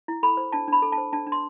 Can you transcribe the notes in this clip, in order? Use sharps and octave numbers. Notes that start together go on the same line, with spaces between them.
E4
A4 B5
C5
D4 A5
D4 B5
A4
A5
C5
D4 A5
D4
C6